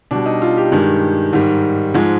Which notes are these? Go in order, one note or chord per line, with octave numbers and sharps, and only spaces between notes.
B2 G3 D4
D#4
F4
G4
G2 D#3 G#3
G#2 D#3 G3
G#2 F3 G#3